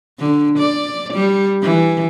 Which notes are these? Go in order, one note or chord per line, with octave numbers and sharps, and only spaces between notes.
D3
D5
G3
E3